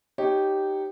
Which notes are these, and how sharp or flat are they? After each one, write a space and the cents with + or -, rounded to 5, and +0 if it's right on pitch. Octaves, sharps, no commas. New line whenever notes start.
D#4 -15 G4 -10 C#5 -20